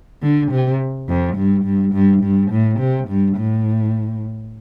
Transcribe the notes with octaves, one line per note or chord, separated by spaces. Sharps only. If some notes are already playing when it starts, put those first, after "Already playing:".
D3
C3
F2
G2
G2
G2
G2
A2
C3
G2
A2